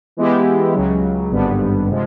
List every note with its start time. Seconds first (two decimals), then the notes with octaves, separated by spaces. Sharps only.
0.17 E3 G#3 B3 E4 G4
0.75 C#2 C#3 F#3
1.32 G#1 G2 D3 G3 B3
1.90 C3 F3 G#3